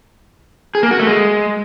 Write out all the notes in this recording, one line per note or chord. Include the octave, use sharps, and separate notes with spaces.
G#4
A#3
F#4
A3
G#3